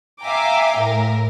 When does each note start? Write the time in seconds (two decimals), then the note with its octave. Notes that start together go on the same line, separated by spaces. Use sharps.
0.21 E5 F5 G5 G#5 A#5 D6
0.76 A2 A#4